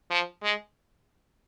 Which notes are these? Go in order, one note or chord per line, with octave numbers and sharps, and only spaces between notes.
F3
G#3